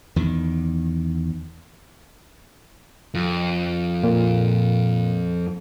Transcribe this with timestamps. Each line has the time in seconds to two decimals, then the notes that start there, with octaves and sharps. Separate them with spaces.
0.16 E2 D#3
3.15 F2
4.03 A#2